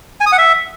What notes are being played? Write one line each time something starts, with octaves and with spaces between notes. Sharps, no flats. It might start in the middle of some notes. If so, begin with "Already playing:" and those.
G#5
D#6
F#5
E5